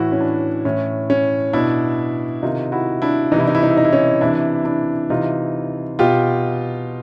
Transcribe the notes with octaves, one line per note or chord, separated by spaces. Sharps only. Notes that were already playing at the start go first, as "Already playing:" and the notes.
Already playing: A2 E3 E4 F#4
C#4
D4
A2 E3 C#4
C#4
B2 D4 E4
C3 D#3 D#4 F4
E4 F#4
D4 E4
E3 D#4
C3 E4
D#4
E4
D#4
E4
D#4
E4
C#4 D#4
C3 E3 D4 E4
D4 E4
C3 E3 D#4 F4
B2 F4 G4